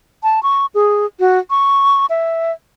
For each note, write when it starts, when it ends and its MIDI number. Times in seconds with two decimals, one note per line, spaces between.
0.23 0.42 81
0.43 0.66 85
0.74 1.06 68
1.20 1.39 66
1.50 2.06 85
2.10 2.52 76